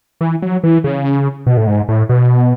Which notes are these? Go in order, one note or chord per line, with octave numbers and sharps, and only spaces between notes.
E3
F#3
E3
C#3
B2
A2
G#2
A2
B2